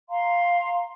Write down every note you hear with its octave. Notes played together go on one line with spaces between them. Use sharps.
F5 A#5 C6